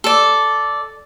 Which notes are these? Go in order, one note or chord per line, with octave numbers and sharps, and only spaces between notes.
A4 D5